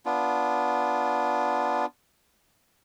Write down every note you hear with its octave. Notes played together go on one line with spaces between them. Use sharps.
B3 D4 F4